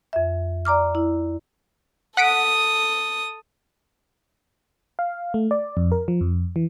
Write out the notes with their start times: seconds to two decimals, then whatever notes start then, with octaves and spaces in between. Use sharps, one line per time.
0.13 F2 E5
0.65 D5 A#5 D6 F6
0.95 E4
2.17 A4 F#5 D#6 B6 D7
4.99 F5
5.34 A3
5.51 D5
5.77 F2
5.92 A#4
6.08 F3
6.21 F2
6.56 E3